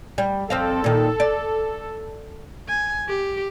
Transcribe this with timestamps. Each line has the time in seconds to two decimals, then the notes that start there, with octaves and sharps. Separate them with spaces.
0.18 G3
0.50 F2 C4 A4 F5
0.84 A#2 D#3
1.20 D5
2.68 G#5
3.08 G4